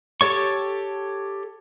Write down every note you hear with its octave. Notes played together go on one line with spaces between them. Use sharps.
G4 A4 C#5 C#6